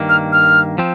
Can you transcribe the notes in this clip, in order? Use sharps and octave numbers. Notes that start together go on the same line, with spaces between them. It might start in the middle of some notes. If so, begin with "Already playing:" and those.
Already playing: G2 D#3 A#3
F6
F6
F3 C4